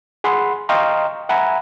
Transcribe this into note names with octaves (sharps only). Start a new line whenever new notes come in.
G#4 F#5 B5 C6
D#5 F5 G5 A#5 C6 C#6
E5 F#5 G#5 A#5 B5